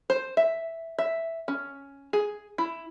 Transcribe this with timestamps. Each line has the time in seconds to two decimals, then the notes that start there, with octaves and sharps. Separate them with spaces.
0.10 C5
0.37 E5
0.99 E5
1.48 C#4
2.13 G#4
2.58 E4